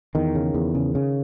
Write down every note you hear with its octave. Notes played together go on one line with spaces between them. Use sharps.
E2 D#3
C#3
E2
C#3
C#3